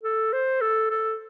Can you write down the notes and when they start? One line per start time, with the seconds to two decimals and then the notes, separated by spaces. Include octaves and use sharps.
0.04 A4
0.33 C5
0.61 A4
0.91 A4